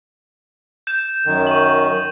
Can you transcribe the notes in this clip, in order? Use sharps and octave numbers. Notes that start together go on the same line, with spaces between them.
G6 E7
F#2 D#3
C#6 F#7